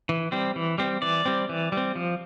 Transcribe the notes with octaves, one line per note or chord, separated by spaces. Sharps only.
E3
G3 C4
E3
G3 C4
E3 D5
G3 C4
E3
G3 C4
F3